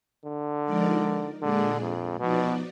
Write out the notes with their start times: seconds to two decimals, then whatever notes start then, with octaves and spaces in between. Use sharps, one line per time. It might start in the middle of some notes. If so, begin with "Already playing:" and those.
0.25 D3
0.64 F3 G#3 D#4 A#4 D5
1.42 A#2 D3 G#3 D4 G#4 D5
1.81 F2
2.20 B2 F3 B3 D#4 F#4 D5